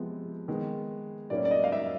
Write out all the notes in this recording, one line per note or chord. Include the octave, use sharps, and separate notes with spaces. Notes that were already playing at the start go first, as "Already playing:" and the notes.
Already playing: C3 F3 G#3 B3
D#3 G#3 B3
A2 F#3 A#3 C#4 D5
D5
D#5
F5
E5